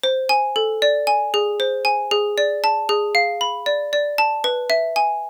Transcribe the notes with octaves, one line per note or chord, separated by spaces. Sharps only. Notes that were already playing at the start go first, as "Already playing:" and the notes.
C5
G#5
A4
D5
G#5
G#4
C5
G#5
G#4
D5
A5
G#4
F5
B5
D5
D5
A5
B4
E5
G#5